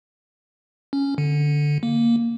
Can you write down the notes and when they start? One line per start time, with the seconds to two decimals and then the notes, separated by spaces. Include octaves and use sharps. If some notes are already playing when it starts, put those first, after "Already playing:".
0.93 C#4
1.18 D3
1.83 A#3